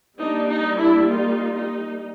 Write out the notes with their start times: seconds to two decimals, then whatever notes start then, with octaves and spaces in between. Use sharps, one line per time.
0.20 G3 A#3 D4 D#4
0.50 D#4
0.81 D4 E4
1.11 D#4 F4
1.56 D#4